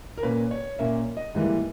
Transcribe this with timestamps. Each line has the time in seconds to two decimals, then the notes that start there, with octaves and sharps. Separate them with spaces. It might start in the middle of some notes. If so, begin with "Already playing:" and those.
0.18 A#4
0.23 A#2 A#3 C#4 B4
0.51 C#5
0.79 A#2 A#3 C#4 E5
1.17 D#5
1.35 G#2 E3 G3 A#3